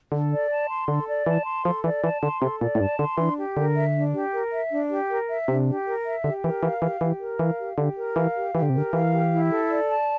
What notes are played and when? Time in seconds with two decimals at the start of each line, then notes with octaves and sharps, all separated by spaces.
0.12 D3 A4
0.32 D5
0.50 A5
0.69 C6
0.88 D3 A4
1.07 D5
1.26 E3 A5
1.46 C6
1.65 F3 A4
1.84 E3 D5
2.04 E3 A5
2.22 D3 C6
2.41 C3 A4
2.60 A#2 D5
2.75 A2
2.80 G2 A5
2.99 D3 C6
3.18 E3 D4
3.38 G4
3.57 D3 A#4
3.75 E5
3.95 D4
4.14 G4
4.34 A#4
4.52 E5
4.71 D4
4.90 G4
5.10 A#4
5.29 E5
5.48 C3 D4
5.67 G4
5.86 A#4
6.06 E5
6.24 D3 G4
6.44 E3 A#4
6.63 E3 F5
6.82 E3 G4
7.01 E3 G4
7.20 A#4
7.39 E3 F5
7.59 G4
7.77 D3 G4
7.97 A#4
8.16 E3 F5
8.35 G4
8.54 E3 G4
8.62 D3
8.70 C3
8.74 D3 A#4
8.93 E3 F5
9.11 G4
9.31 E4
9.49 A4
9.69 D5
9.88 A5